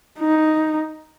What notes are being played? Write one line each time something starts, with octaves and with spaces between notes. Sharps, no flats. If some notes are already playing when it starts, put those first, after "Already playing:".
D#4